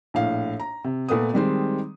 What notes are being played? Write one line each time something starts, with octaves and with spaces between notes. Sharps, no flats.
A#1 A2 F5
A#5
C3
A#2 A3 B3 D#6
D#3 G3 G#3 C4